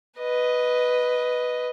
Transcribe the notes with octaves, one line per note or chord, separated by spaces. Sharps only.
B4 D#5